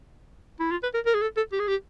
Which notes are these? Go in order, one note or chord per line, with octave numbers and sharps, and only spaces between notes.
E4
F4
B4
A#4
A#4
G#4
A4
A4
G4
G#4
G4